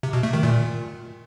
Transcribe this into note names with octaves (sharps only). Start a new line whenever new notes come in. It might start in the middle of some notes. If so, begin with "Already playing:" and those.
C3
B2
A3
D#3
A#2